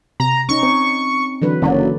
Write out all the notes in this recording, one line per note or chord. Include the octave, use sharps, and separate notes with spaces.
C3 A#5
C#4 D#4 C#6
C4
D3 E3 F#3 B4
F#1 D3 F#3 A#3 D5